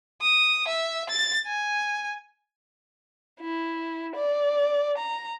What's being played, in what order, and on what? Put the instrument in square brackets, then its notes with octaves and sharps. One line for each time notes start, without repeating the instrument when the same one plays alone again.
[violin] D#6
E5
A6
G#5
E4
D5
A#5